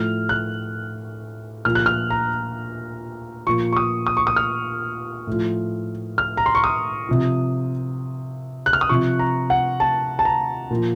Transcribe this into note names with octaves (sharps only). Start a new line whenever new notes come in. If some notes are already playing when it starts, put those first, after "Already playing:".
Already playing: A2 F3 F6
F#6
A#2 F3 F6
F#6
F6
A#5
A#2 F3 C#6
C#6
D#6
D#6
C#6
D#6
F6
A2 F3
F6
A#5
C6
C#6
D#6
C3 F3
F#6
F6
D#6
C3 F3 C#6
A#5
F#5
A5
A5
A#5
A#2 F3